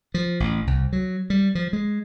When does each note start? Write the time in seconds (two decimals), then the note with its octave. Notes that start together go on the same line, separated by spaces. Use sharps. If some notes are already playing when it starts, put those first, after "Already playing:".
0.14 F3
0.40 A1
0.67 C2
0.93 F#3
1.30 G3
1.55 F3
1.73 G#3